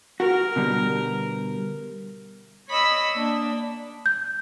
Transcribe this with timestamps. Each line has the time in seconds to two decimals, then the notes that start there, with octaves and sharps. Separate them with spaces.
0.20 F#4 A#4
0.56 B2 D3 G3
2.68 C#5 D#5 B5 E6
3.13 A#3 D4
4.06 G6